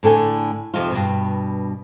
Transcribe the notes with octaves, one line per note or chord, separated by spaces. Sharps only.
A2 D3 A4 G#5
F2 C3 F3 D#4 F4
G2 B2